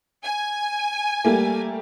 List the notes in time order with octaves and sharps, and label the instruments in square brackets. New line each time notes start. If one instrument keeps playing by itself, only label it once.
[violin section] G#5
[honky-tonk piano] G3 A3 A#3